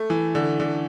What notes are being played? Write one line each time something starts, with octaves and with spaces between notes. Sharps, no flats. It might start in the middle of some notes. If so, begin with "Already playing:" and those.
Already playing: A3
E3
D3
D3